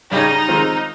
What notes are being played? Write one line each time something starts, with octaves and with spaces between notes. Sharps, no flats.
C#3 G3 C#4 D#4 G4
D#3 G#3 C4 F4